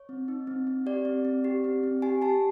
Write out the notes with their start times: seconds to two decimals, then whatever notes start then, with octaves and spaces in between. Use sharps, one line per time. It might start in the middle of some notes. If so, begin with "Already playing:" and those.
Already playing: C#5
0.09 C4
0.28 D#4
0.47 C4
0.67 C4
0.86 G4 D5
1.05 C4
1.25 C4
1.44 G4
1.64 C4
1.83 C4
2.02 G4 G#5
2.22 G4 A5